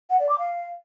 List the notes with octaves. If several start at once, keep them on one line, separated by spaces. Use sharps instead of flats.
F#5
D5
D6
F5